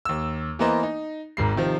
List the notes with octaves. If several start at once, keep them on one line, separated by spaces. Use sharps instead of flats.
D#2 E6
E3 A#3 B3 A#4 C5 D#5
D#4
G#1 G#2 C7
C3 D#3 F3